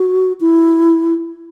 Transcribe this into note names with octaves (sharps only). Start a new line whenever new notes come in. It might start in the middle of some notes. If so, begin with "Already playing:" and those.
Already playing: F#4
E4